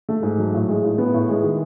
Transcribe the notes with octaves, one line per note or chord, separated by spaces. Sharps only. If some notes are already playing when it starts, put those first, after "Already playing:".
A3
G#2
F#3
A2
G#3
A2
B3
A2
G#3
D#3